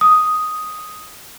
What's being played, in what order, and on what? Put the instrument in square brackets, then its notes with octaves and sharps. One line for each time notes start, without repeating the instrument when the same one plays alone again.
[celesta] D#6